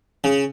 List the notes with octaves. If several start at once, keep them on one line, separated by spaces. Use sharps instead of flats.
C#3